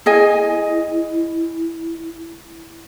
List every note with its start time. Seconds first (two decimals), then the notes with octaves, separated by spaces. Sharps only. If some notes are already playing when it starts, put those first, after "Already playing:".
0.06 E4 G#4 D#5 G#5